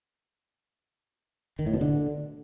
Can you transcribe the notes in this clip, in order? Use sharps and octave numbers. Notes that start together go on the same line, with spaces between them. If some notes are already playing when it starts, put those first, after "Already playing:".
D#3
A2
B2
D3